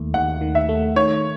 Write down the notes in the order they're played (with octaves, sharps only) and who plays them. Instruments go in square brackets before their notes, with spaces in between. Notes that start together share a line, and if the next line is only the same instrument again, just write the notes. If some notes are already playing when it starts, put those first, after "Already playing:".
Already playing: [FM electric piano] D#2 D#3 A3
[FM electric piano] D#2 [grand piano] F#5
[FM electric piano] D#3
[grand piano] E5
[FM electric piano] A3
[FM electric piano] D#3 [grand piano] C#5